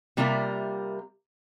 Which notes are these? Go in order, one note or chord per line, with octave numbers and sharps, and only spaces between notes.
C3 G3 A#3 F4 A#4 E5